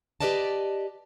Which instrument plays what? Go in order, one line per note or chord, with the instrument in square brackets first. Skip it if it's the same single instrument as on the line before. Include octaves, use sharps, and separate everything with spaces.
[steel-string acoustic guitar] G4 A#4 B4 D5 D#5 A5